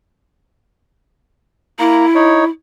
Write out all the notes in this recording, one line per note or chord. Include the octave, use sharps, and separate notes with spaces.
A#3 E4 A#5
D#4 C#5